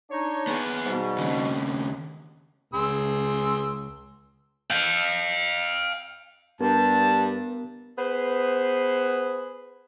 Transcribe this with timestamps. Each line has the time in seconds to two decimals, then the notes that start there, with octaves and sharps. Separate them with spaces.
0.10 D4 D#4 C#5
0.47 B3 G#4
0.86 G#2 B2 G3
1.18 D#2 C#3
2.74 C#2 G#4 C6 E6
4.70 F5 G5
6.61 G2 B3 A#4 A5
7.98 B3 G#4 B4 C5